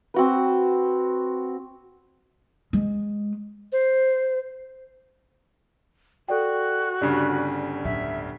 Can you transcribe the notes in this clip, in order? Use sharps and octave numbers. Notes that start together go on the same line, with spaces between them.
C4 F#4 B4
G#3
C5
F#4 A4 D5 G5
G1 C#3 D4 G4 D5
D1 C#4 E5